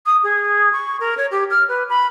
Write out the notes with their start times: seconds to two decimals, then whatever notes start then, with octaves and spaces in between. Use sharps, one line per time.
0.06 D#6
0.24 G#4
0.73 C#6
1.00 A#4
1.17 C#5
1.31 G4
1.50 F6
1.69 B4
1.89 B5